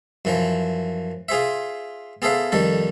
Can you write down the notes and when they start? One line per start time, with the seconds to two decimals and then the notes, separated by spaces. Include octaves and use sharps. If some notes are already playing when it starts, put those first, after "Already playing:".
0.25 F#2 E3 F3
1.29 F4 G#4 C5 E5
2.22 B3 G#4 A4 C5 E5 F5
2.52 F2 D#3 G3 A4